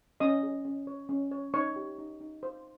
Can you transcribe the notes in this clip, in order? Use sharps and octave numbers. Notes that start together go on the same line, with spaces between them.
C#4 D#5 D#6
G#4
C#4
C#5
C#4
C#5
D#4 C#5 C#6
G4
D#4
D#4
C5